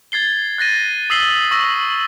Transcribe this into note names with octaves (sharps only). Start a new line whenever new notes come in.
G#6 A6 C7 G7
F#6 A6 A#6 D#7
D#6 E6 B6 C7 F#7 G7
C#6 E6 A#6